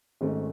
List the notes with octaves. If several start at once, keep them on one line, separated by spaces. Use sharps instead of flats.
G#1 G#2 D#3 A3 C#4